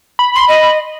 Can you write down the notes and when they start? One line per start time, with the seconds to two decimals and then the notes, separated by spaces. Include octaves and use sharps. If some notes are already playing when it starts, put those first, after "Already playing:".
0.19 B5
0.35 C6
0.48 D#5